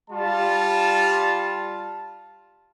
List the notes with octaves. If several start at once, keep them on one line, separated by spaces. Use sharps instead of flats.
G3 F4 A5